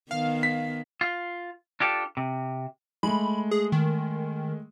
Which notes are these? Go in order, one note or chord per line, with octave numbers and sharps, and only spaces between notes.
D#3 B3 F5
B6
F4
D4 F4 G4 A4
C3
G#3 A3 B5
G#4
D#3